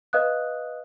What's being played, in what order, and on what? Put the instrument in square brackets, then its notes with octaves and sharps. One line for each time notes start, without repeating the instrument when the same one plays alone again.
[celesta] B4 D#5 F5 D#6 F#6